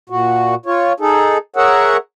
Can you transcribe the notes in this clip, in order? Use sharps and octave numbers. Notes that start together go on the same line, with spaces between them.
A#2 F#4
F4 C#5
D#4 G#4 A4
G#4 A#4 C#5 E5 F#5